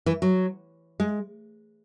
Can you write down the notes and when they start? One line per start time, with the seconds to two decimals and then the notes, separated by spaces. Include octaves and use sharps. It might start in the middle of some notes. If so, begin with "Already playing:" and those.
0.06 E3
0.22 F#3
1.00 G#3